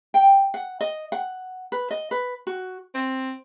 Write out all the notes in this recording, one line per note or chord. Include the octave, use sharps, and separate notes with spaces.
G5
F#5
D#5
F#5
B4
D#5
B4
F#4
C4